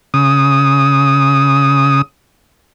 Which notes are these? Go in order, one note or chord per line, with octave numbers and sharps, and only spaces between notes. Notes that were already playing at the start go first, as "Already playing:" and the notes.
C#3 D#6